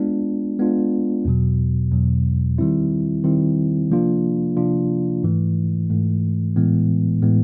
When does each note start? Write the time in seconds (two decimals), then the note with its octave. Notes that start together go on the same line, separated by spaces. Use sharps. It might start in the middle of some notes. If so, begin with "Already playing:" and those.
Already playing: G#3 B3 D4 F4
0.59 G#3 B3 D4 F4
1.25 E2 B2 F#3
1.92 E2 B2 F#3
2.58 D#3 G3 C4 E4
3.24 D#3 G3 C4 E4
3.90 C3 F3 A#3 D4 F4
4.57 C3 F3 A#3 D4 F4
5.23 G#2 E3 A3
5.90 G#2 E3 A3
6.56 A2 E3 G#3 B3
7.22 A2 E3 G#3 B3